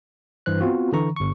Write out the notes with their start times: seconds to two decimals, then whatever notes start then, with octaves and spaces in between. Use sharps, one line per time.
0.46 G2 E3 C5 F#6
0.61 B3 C4 F4 F#4
0.92 D3 E3 A#5 C#6
1.16 G1 C#6